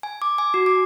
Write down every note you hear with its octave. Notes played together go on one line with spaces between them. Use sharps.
G#5
D6
G#5
F#4
D6